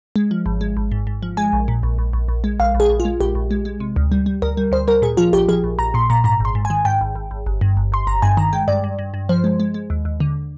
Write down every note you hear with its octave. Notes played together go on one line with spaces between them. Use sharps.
G#3
F3
G#1
G#3
G#1
G#2
G#2
F3
G#3 G#5
A#1
A#2
A#1
A#1
A#1
A#1
G#3
A#1 F5
A#1
G#4
A#1
F4
G#3
A#1 G4
A#1
G#3
G#3
C3
D2
G3
G3
D2 A#4
G3
D2 C5
G3 A#4
A#2 G#4
F3 F4
A#1 G4
F3 G#4
A#1
A#1 A#5
A#2 C6
A#2 A#5
G#2 A#5
G#1 C6
G#2
G#5
D#3
G#2 G5
G#1
G#1
G#1
G1
G2
G1
G1 C6
G1 A#5
G2 G#5
D#3 A#5
G#3 G5
G2 D5
G2
G2
G2
F3 C5
G#3
G#3
G#3
D#2
D#2
D3